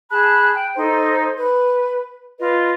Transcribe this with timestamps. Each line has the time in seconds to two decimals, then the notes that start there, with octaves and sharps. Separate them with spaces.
0.11 G#4 A5 B5 F#6
0.54 G5
0.76 D#4 A4 C5
1.37 B4
2.39 F4 B4 D#5